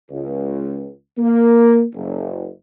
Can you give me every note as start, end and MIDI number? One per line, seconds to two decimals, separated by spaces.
0.10 0.89 37
1.18 1.84 58
1.95 2.47 30